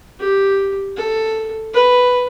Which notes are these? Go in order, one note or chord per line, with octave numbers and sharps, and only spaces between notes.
G4
A4
B4